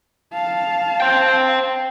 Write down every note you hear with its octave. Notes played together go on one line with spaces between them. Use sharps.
F5 A5
C5 G5